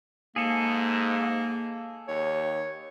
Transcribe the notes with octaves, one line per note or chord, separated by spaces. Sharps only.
G#2 A#3 G#4 A4
D#2 C#5